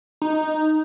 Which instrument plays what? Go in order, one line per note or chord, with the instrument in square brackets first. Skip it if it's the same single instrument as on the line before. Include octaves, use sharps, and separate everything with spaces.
[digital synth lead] D#4